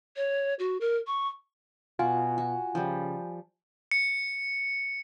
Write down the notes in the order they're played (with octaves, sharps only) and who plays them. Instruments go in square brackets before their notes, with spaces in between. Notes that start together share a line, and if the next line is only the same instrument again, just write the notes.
[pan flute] C#5
F#4
A#4
C#6
[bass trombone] B2 [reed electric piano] F4 [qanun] F#4 [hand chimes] G#5
[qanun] F#4
[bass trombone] C#3 [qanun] F3 G3
[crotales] C#7